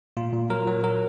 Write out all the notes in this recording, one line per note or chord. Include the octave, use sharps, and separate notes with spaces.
A#2 F4
A#2
F#3 A#4
F#3
F#3 A#4